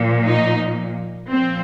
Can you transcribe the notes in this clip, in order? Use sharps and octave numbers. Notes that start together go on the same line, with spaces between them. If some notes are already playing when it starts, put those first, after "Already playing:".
Already playing: A#2 F3
D#4
A#2 F3 C4